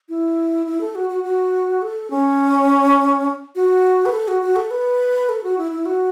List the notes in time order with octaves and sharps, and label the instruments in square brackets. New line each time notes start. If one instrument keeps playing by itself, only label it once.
[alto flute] E4
E4
A4
F#4
F#4
F#4
A4
C#4
F#4
B4
A4
F#4
F#4
A4
B4
A4
F#4
E4
E4
F#4